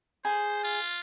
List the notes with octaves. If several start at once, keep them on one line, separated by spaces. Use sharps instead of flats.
G#4 C5
F4